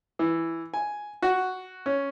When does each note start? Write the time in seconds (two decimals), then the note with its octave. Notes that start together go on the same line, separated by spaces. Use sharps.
0.19 E3
0.74 G#5
1.22 F#4
1.86 C#4